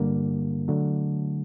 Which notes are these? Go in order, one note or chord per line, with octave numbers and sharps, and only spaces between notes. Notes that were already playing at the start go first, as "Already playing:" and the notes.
Already playing: G2 D3 G3 A#3
D3 F#3 A3